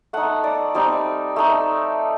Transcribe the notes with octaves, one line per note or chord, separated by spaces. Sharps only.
A3 D#4 F#5
D5
G3 C4 D#4 D5
A3 D#4